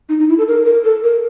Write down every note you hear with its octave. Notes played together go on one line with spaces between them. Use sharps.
D#4
D#4
E4
A4
A#4
A#4
A4
A#4